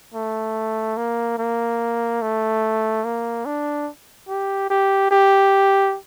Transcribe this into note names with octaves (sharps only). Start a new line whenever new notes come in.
A3
A#3
A#3
A3
A#3
D4
G4
G4
G4